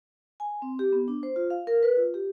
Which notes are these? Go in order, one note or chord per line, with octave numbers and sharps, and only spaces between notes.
G#5
C4
G4
B3
D4
C5
F4
F5
A#4
B4
F4
G4